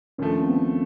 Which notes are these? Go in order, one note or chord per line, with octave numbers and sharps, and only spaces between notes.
D#2 D3 F3 A3 C#4
C4
B3